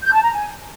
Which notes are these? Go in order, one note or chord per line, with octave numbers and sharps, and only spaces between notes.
G6
A5
A#5
G#5